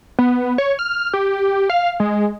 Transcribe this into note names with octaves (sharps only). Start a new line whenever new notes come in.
B3
C#5
F6
G4
F5
G#3